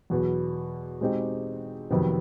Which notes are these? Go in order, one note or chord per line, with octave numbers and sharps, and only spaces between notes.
E2 B2 F#3 B3
B2 G#3 C4 D#4 G4
F2 C3 D#3 F#3 B3